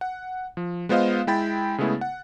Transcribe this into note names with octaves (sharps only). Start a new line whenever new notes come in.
F#5
F3
G#3 B3 F4 C5 D#5 F5
G#3 E4 G5 B5 A6
C#3 G#3 A3 B3 E4 G#4
F#5